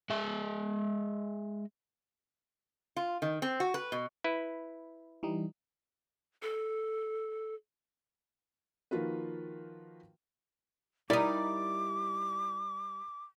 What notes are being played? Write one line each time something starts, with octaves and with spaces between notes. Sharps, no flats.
G#3 E5
F4
D#3
C4
F#4
B4
B2
E4 B4
E3 G3 D#4
A4
D#3 F3 A#3 F4 F#4 B4
G3 D#4 E4 A#4 D5 D6